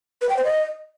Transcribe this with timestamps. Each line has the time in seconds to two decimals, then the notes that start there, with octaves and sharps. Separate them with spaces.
0.22 B4
0.29 G5
0.37 C5
0.44 D#5